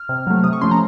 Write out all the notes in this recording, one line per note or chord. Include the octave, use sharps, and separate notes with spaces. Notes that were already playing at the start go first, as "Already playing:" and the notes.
Already playing: F6
C3
F#3 A3
C3 D#6
C#6
F3 A3 C#4 C6
A#5